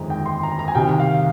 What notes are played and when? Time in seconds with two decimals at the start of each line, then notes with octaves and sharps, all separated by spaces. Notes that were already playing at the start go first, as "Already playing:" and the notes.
Already playing: G1 F2 D#3 G#3 A#5
0.10 G5
0.26 C6
0.43 A#5
0.59 A#5
0.68 G#5
0.75 C2 C3 D#3 G5
1.00 F5